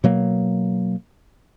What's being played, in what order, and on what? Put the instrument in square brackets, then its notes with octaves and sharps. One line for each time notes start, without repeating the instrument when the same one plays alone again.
[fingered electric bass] B2 F#3 A#3